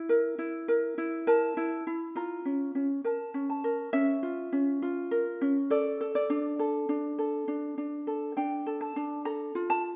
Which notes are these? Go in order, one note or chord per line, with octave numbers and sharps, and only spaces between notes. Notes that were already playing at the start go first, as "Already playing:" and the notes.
Already playing: E4
A#4
E4
A#4
E4
A#4 A5
E4
E4
F4 A#5
C#4
C#4
A#4 A5
C#4
A5
A#4
C#4 E5
F4
C#4
F4
A#4
C#4
A4 D5
A4
D5
D4
A4
D4
A4
D4
D4
A4
D4 G5
A4
A5
D4
A4 A#5
F4
A5